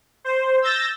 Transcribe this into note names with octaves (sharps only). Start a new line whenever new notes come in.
C5
E6 G6 A6 A#6